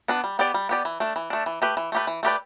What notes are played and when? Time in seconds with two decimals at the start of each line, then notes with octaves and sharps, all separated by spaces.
0.08 B3 D4 B4
0.24 G3
0.39 B3 G4 D5
0.54 G3
0.69 B3 G4 D5
0.85 E3
1.00 A3 D4
1.16 E3
1.30 A3 D4
1.46 E3
1.62 A3 G4 B4
1.77 E3
1.92 A3 G4 B4
2.07 E3
2.23 A3 G4 B4 D5